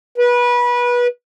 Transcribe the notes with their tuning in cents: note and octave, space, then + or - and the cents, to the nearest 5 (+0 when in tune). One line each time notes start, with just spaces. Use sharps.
B4 -25